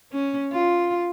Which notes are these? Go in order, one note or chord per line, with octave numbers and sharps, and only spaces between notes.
C#4
F4